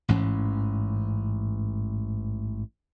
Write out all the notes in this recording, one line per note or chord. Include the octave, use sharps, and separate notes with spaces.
A1 G#2 E3 C#4